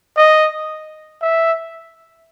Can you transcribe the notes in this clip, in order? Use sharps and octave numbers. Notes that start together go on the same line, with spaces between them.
D#5
E5